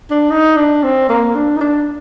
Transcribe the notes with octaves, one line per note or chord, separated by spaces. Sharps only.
D4
D#4
D4
C4
A#3
D4
D#4
D4